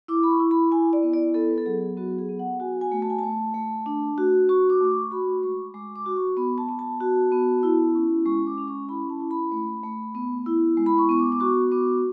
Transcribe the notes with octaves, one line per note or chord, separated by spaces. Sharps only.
E4 D6
B5
C#6
E4
B5
E4 G#5
D5
B3
D5
B3 A4
B4
A4
F#3 G#4
B3 F#4
G#4
B3
F#5
F#4 G#5
G#5
A3
A5
G#5
A3 A5
A3
D4
F#4
F#4 C#6
D6
A3 D6
C#6
C#6
F#4 B5
G#3 C#6
G#3 D6
D6
F#4
C#6
B3 B5
A5
B3
A5
F#4
B3
E4
C#4
G#3 C#6
D6
C#4
C#6
E4 B5
A5
E4
B5
A3
A3
B3
E4
G#3
B5
C#6
B3 C#6
D6
D6
F#4 C#6
B3 D6